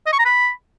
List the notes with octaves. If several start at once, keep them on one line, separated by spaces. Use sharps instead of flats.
D#5
C#6
A#5
B5